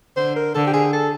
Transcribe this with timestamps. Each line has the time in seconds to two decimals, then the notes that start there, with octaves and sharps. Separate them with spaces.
0.16 D3 C5
0.36 A#4
0.55 D3 A4
0.67 G4
0.73 G#4
0.93 A4